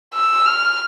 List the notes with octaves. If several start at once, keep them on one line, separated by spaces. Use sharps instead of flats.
E6
F6